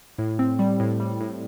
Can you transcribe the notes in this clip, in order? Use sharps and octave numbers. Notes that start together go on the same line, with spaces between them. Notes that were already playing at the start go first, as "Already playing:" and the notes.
A2
C4
G3
A2
G3
A2